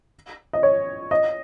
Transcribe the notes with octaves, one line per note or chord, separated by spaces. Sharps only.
D#5
C#5
D#5